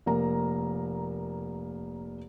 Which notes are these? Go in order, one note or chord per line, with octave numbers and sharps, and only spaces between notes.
F1 A#3 A#5